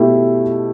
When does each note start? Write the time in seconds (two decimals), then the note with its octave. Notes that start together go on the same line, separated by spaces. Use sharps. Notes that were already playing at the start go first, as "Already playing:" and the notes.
Already playing: B2 A3 E4 G4